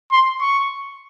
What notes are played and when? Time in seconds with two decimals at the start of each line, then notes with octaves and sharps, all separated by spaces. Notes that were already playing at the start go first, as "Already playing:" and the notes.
0.12 C6
0.41 C#6